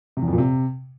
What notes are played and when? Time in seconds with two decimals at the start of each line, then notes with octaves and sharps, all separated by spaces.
0.17 C3
0.22 E2
0.27 F2
0.33 A#2
0.38 C3